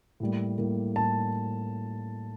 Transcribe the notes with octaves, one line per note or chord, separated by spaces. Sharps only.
A2 G3 A#3
A2 G3 A#3
A2 G3 A#3 A5